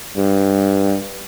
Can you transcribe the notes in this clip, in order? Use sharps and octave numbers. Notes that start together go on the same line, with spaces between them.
G2